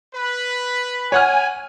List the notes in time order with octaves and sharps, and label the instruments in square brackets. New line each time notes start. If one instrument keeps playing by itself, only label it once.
[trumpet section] B4 B5
[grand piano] C#5 F#5 F6 [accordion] G#5